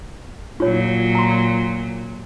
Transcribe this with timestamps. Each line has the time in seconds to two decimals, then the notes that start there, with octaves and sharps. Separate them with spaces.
0.60 A#2 F#3 F4 C#5
1.15 A#5 C6